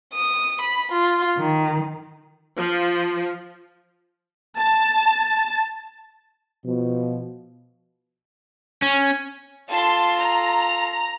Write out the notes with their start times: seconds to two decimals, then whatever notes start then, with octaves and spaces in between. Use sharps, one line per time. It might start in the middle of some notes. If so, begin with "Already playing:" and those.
0.14 D#6
0.61 B5
0.92 F4
1.38 D#3
2.58 F3
4.58 A5
6.65 B2 F3
8.82 C#4
9.70 F4 A4 A5 C6
10.18 A#5